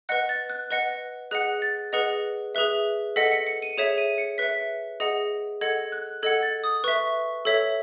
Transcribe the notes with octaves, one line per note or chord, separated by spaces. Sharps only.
B4 D#5 F#5 F#6
A6
F#6
B4 D#5 F#5
G#4 D#5 F#5 F#6
A6
G#4 B4 D#5 F#5
G#4 B4 E5
A4 D#5 F#5 B6
C#7
C#7
D#7
G#4 C#5 E5 E7
D#7
C#7
B4 E5 B6
G#4 D#5 F#5
A4 D#5 F#5 G#6
F#6
A4 D#5 F#5 G#6
A6
D#6
B4 E5 C#6
A4 C#5 E5